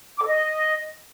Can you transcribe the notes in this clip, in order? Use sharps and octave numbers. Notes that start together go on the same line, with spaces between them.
D6
A4
D#5